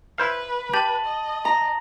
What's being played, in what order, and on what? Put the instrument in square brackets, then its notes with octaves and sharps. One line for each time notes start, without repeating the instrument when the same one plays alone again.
[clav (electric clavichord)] E4 C5 F5 [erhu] B4
[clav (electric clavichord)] G4 [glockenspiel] A5 A6 F#7
[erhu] D#5
[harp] A#5